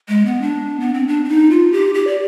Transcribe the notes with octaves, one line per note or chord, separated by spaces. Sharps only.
G#3
B3
D4
B3
C4
D4
D4
D#4
F4
G4
G4
D5